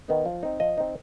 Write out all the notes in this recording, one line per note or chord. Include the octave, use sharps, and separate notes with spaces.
D#3 B3 D#4
F3
C4 D#4
F3 D#5
C4 D#4